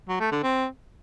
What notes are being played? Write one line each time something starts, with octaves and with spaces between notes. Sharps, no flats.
F#3
A3
D3
C4